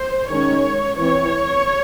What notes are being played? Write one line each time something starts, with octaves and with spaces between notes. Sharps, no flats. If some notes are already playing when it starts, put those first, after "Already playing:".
Already playing: C5
D#3 G#3 C#4 C#5
E3 C4 C#5